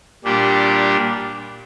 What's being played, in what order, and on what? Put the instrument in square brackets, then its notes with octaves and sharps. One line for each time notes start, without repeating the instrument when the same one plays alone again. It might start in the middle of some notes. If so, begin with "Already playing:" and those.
[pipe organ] A#2 G3 D4 G4